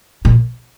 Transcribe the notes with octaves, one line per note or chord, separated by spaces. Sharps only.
A#2